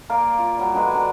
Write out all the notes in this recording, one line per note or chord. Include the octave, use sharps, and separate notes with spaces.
A#3 A#4 D5 F5
F4
F#3 G3
D3 F#3 G#3 B4
D4 D5